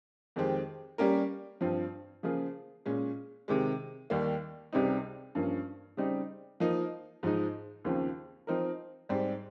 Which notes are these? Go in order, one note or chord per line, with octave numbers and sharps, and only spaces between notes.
F2 D#3 G#3 C4 G4
G3 A#3 C#4 G4 A#4
G2 F3 C4
C#3 F3 A#3 F4 G#4
A#2 G#3 C#4
C3 D#3 G#3
D#2 D#3 G3 A#3
C#2 C3 G3 C4 D#4
G2 F3 A#3 C#4
C#3 G3 C4 D#4
F3 A#3 D#4
G#2 F3 G#3 D#4
D#2 C#3 F3 C4
F3 C4 D#4 A#4
G#2 G3 C4